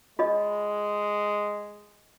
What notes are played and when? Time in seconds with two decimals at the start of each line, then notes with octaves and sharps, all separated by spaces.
0.19 G#3 F4 C#5 D#5